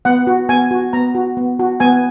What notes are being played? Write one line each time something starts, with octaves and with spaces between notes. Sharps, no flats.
B3 F#5
F#4
B3 G#5
F#4
B3 A#5
F#4
B3
F#4
B3 G#5